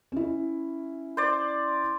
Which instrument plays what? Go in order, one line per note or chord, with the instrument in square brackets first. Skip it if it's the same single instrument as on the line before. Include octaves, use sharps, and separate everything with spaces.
[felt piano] C#4 E4
[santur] C5 D5